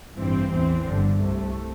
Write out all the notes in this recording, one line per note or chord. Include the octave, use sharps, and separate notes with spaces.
A1 G2 E3 C4
E2 E3 C4
G1 G2 D3
C2 C3 A3